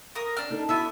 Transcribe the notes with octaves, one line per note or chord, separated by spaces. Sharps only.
A#4 D#6
D4 F6
D#4 A4
B3 E4 F#4 E5